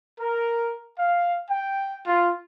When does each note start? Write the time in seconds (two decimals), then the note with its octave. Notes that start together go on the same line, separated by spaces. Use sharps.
0.20 A#4
0.99 F5
1.49 G5
2.07 F4